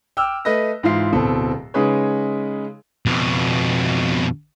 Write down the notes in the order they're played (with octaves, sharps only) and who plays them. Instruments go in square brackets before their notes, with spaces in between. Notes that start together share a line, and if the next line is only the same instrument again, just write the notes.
[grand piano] G5 D6 E6 F6
A3 B4 D#5 A#6
G#2 E3 F4 C7
D1 B2 C4 A4
C#3 G#3 D#4 G#4 B4 C#5
[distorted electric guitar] F2 B2